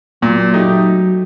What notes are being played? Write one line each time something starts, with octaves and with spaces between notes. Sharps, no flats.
A#2 F#3
A3 D#4 G4